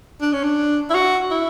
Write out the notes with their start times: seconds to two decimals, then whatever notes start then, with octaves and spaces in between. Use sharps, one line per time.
0.21 D4
0.33 C#4
0.44 D4
0.90 E4
0.94 F#4
1.31 E4